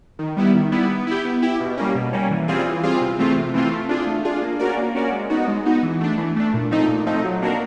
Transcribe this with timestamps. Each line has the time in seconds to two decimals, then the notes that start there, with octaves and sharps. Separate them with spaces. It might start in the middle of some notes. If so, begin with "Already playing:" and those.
0.19 D#3
0.37 G3 B3 E4
0.54 D#3
0.72 G3 B3 E4
0.89 B3
1.07 E4 G4
1.25 B3
1.42 E4 G4
1.60 B2
1.77 G3 A#3 C#4
1.95 B2
2.13 G3 A#3 C#4
2.31 E3
2.48 G3 C4 F4 G#4
2.66 E3
2.83 G3 C4 F4 G#4
3.01 C3
3.19 E3 A3 C4 F4
3.36 C3
3.54 E3 A3 C4 F4
3.72 A3
3.89 D4 F4 G#4
4.07 A3
4.25 D4 F4 G#4
4.42 A#3
4.59 C#4 F#4 A#4 D5
4.77 A#3
4.95 C#4 F#4 A#4 D5
5.12 G#3
5.30 B3 D#4 F#4
5.48 G#3
5.65 B3 D#4 F#4
5.83 E3
6.01 A3 D4
6.18 E3
6.36 A3 D4
6.54 A#2
6.71 F3 A3 C4 D#4
6.88 A#2
7.06 F3 A3 C4 D#4
7.24 F#3
7.42 A#3 D4 F#4 A#4